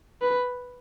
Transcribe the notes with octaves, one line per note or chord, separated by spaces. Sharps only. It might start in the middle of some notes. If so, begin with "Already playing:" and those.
B4